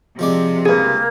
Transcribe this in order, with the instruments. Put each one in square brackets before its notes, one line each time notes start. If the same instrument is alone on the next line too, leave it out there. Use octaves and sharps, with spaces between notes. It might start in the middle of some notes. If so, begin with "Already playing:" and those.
[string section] C3 [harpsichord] F3 G#3 D5
[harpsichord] C#2 G2 [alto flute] A#3 [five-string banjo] G#4 B4